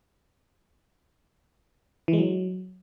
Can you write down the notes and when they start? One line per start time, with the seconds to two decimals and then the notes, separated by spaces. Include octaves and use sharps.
2.08 E3
2.13 G#3
2.18 F#3